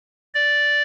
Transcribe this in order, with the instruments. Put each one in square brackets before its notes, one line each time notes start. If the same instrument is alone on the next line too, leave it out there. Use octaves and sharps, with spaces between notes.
[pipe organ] D5